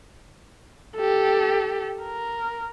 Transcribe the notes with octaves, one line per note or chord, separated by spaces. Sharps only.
G4 A4
A#4